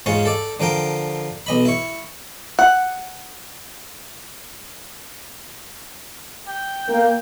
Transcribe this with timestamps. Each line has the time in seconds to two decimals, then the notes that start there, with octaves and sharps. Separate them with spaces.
0.06 G#2 G#3 C#4 F4 C#5
0.25 A4 D5
0.60 D3 F3 A#4 G5
1.47 B1 D#5 B5
1.65 E4 C#6
2.59 F#5
6.48 G5
6.89 A#3